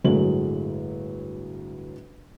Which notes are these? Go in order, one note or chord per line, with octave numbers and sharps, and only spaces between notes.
G1 A2 F#3 G#3 F#7